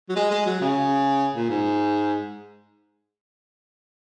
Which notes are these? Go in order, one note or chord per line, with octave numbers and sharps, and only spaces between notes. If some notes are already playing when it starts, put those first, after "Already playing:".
F#3
G#3
G#3
F#3
C#3
A#2
G#2